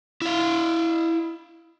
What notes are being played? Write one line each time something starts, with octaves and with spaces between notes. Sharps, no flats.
E4 F5